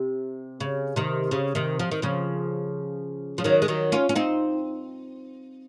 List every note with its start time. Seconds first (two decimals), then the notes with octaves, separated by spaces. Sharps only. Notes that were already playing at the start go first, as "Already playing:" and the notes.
Already playing: C3
0.60 C#3
0.96 C3 D#3
1.31 C#3
1.55 C3 D#3
1.79 F3
1.91 D#3
2.02 C#3 F3
3.38 F3
3.44 D#3 F#3
3.62 G#3
3.68 D#3 F#3
3.92 C#4 F4
4.09 C#4
4.16 C4 D#4